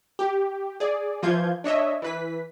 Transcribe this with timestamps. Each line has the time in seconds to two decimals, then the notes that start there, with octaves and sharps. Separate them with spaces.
0.19 G4
0.80 G#4 D5
1.22 E3 F3 F4 G6 G#6
1.64 D4 C#5 D#5 E5
2.02 E3 B4 B6